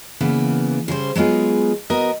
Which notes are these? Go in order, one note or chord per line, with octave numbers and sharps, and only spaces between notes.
C#3 E3 A#3 B3
C#3 G3 G#4 C5
F#3 G#3 B3 F4 G#4
B3 F#4 A#4 D#5